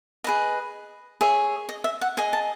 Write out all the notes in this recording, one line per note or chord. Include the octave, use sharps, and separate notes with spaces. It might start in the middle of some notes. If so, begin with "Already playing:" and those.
G#4 B4 D#5
G#4 C#5 E5
D#5
E5
F#5
G#4 D#5 G#5
A5